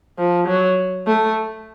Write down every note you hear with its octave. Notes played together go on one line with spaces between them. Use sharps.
F3
F#3
A3